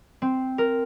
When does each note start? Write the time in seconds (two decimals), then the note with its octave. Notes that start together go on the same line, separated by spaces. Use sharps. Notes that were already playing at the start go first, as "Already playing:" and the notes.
0.22 C4
0.58 A#4